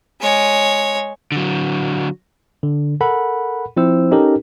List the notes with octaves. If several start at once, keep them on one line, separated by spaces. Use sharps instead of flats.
G#3 C#5
D3 F#3
D3
A4 A#4 F#5 B5
F3 C4 E4 C5 E6
C#4 D#4 G4 A4 A#4